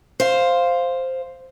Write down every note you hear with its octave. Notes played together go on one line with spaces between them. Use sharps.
C5 F5